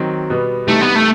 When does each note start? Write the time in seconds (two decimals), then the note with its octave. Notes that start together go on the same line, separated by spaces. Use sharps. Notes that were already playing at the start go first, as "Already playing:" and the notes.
Already playing: D#3 F#3 C4
0.30 B2 G3 B3
0.67 C3 E3 G3 A3 D#4
0.81 B3
0.96 A3